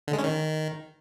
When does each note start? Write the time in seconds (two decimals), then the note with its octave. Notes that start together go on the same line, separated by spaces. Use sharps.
0.08 D3
0.13 G#3
0.18 C#4
0.24 D#3